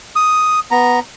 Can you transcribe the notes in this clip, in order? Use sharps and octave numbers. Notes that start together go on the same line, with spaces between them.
D#6
B3 A#5